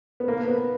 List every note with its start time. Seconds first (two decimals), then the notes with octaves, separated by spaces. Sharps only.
0.20 B3
0.28 A#3
0.48 B3